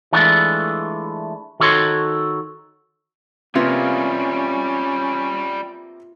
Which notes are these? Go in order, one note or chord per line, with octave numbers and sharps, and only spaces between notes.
E3 G#3 A3 D4 F4
D#3 F#4 A4 C#5 C6
C3 G3 A#3 B3 C#4 F4 G#4